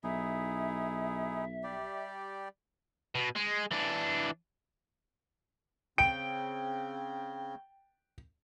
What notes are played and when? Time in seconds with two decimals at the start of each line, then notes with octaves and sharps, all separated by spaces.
0.04 B1 D#4 E4 G#4 E5
1.64 G3 G4 D5
3.15 B2
3.36 G#3
3.71 E3 D4
5.98 C#3 C4 G5 D7